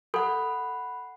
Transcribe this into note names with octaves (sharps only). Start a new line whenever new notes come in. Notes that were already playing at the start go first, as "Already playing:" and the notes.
A4 F#5 B5